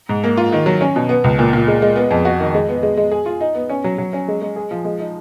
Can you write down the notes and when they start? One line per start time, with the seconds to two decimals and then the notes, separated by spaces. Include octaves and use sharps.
0.09 G#2
0.24 A#3
0.37 F4
0.52 D#3
0.66 F#3
0.81 C#4
0.96 B2
1.09 B3
1.24 C#2
1.39 A#2
1.53 A#2
1.68 G#3
1.82 G#3
1.96 B3
2.11 F2
2.25 F#4
2.40 D#3
2.54 G#3
2.69 B3
2.83 G#3
2.97 G#3
3.11 G#4
3.26 F4
3.41 D#4
3.55 B3
3.69 C#4
3.84 F#3
3.98 F#3
4.13 C#4
4.28 G#3
4.42 G#3
4.56 G#4
4.71 F3
4.85 G#3
5.00 D#4